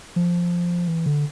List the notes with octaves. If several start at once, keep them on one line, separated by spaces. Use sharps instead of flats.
F3
E3
D3